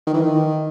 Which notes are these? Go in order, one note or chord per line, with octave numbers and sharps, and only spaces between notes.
D#3
E3
D#3